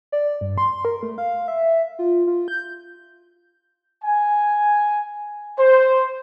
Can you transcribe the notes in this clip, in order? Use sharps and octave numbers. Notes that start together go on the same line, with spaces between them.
D5
G2
C6
A#4
A3
F5
E5
F4
F4
G6
G#5
C5